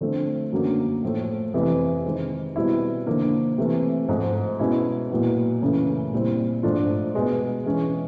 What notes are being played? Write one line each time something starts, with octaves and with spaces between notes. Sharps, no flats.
D3 F3 A3 C4
F#2 D3 F#3 A#3
A2 F3 A3
F2 C3 E3
D#3 G#3 C4
B2 G3 C4 E4
D3 F3 A#3 D#4
C3 E3 A3
G#2 F3 A3
B2 G#3 C#4 E4
A#2 F#3 B3 E4
F#2 C#3 E3 A3
A#2 G3 C4 E4
G#2 F3 A3 D4 F4
B2 G#3 B3
E3 G#3 C#4